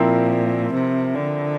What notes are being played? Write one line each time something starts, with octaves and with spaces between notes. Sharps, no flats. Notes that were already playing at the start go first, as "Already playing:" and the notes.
Already playing: A#2 F3 C4 E4 A#4
C3
D3